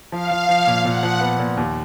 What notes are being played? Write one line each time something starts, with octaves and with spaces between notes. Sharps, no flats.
F3 F5
F3
F3
A#2
A#2 F#5
F3
B3
A#2
D#2